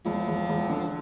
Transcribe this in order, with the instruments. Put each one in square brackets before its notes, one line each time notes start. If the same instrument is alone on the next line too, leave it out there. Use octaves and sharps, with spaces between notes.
[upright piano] E1 [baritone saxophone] F3
[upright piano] E1
E1
D3